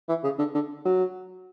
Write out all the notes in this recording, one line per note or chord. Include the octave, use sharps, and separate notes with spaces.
E3
C#3
D3
D3
F#3